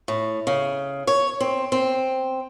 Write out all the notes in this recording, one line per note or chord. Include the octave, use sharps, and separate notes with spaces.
A2
C#3
C#5
C4
C4